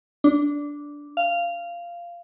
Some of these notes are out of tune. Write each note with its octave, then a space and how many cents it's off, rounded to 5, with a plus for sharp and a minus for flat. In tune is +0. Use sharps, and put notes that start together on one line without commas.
D4 -10
F5 -10